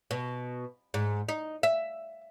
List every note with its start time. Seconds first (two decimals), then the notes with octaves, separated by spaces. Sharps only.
0.11 B2
0.94 G#2
1.29 D#4
1.63 E5